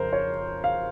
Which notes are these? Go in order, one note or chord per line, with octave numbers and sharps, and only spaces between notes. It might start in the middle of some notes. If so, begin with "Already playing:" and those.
Already playing: F2 C#3 A#4 C5
C#5
F5